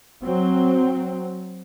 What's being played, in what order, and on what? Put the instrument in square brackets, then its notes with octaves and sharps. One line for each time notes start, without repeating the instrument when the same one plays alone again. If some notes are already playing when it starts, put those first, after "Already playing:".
[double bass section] F#3 C4